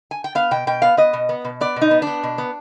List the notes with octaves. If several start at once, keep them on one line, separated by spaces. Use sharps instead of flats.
G#5
G5
B3 F5
B2 G5
B2 G5
B3 F5
B3 D#5
B2
B3
B2
B3 D5
B2
D#4
B3
B3 D4
B2
B3